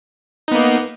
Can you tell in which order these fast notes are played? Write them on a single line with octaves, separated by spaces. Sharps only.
D#4 B3 A#3